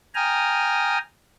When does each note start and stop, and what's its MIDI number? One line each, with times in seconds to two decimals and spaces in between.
0.15 0.98 79
0.15 0.98 80
0.15 0.98 82
0.15 0.98 87
0.15 0.98 89